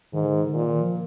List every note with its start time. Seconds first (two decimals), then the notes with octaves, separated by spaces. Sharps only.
0.13 G#2 D#3
0.24 D3
0.34 D#3
0.44 D3
0.54 A#2 D#3
0.68 D#3
0.81 F3